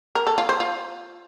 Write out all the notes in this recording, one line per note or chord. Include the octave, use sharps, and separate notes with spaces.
A#4
A4
F4
C5
F4